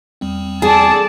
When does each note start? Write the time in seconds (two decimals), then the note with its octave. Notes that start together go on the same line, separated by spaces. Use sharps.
0.21 E2 G3 C4
0.62 G#4 A4 D5 A5